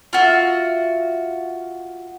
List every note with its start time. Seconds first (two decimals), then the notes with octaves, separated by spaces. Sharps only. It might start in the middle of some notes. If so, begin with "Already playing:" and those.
0.13 F4 F#4 E5